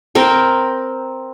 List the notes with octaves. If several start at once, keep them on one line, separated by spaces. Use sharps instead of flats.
C4 A#4 G5